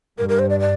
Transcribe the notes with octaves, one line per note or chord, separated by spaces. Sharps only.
G2 A#4
A#4
C5
D5
D5